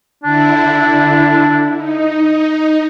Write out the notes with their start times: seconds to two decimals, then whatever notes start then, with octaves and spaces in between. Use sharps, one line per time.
0.24 D3 D4 E4
1.77 D#4